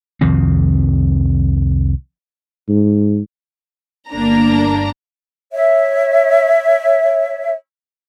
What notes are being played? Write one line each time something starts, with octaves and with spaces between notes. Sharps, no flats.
C2 F2 D#3 C4
G#2
G1 A#3 D4 A#5
C#5 E5